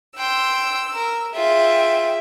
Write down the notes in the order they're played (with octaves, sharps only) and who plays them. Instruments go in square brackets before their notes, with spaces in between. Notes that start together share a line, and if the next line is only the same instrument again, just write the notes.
[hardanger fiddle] G5 C6 [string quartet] E6
[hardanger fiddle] A#4
[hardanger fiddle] F4 [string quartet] G#4 E5 G5